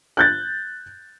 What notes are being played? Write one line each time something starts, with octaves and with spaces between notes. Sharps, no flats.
F#6 G6 A6